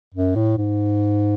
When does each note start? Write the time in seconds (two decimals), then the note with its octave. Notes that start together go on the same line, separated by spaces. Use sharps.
0.14 F#2
0.35 A2
0.57 G#2